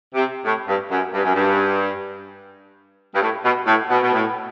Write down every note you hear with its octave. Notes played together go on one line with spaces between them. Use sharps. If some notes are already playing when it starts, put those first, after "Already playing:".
C3
A2
G2
F#2
G2
F#2
G2
G2
A2
B2
A2
B2
B2
A2